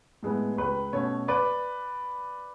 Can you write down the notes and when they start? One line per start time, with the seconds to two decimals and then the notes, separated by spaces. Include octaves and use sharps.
0.23 A2 G#3 B3
0.57 C#2 B4
0.93 B2 A3 C#4 C#5
1.28 B4 D5